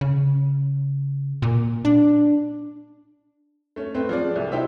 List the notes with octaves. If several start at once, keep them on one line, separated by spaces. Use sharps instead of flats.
C#3
A#2
D4
A3 C#4
A3 C4 B4 C5
F3 G#4 D5
C2
D#4 E4 G4 C5 E5